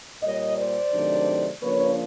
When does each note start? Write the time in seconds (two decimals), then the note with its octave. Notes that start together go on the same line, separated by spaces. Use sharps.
0.23 A#2 G3 A#3 C#5 D#5
0.58 C5 D5
0.93 C3 D#3 F#3 A3 D4
1.62 C#3 F3 A#3 D4 B4 C#5